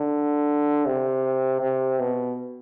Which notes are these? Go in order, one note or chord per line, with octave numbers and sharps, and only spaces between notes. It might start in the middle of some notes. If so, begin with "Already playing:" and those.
Already playing: D3
C3
C3
B2